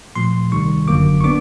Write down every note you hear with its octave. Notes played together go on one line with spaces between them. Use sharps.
A#2 F3 A3 C6
C2 C3 D#3 G3 C#6
G1 F#2 D3 F#3 A#3 D6
C#6
B3 D4 D6